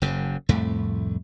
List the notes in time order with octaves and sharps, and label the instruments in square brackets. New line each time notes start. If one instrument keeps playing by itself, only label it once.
[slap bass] F#1 F#2 C#3
C2 F2 A2 A3